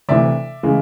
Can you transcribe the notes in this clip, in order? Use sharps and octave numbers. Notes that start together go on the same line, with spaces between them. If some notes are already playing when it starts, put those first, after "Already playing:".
D2 C3 E3 D5 E5
C#3 E3 G#3